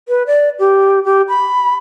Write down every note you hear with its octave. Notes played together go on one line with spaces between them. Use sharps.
B4
D5
G4
G4
B5